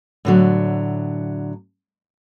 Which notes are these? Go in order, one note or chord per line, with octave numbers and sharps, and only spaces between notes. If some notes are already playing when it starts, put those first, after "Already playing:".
A2 D3 F#3